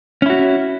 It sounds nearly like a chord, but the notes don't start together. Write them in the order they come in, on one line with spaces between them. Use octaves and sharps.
C#4 E4 F#4